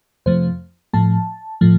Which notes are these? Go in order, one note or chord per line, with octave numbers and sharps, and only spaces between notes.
F2 C3 F3 A3 C5
A2 F3 A3 A5
A2 F3 A3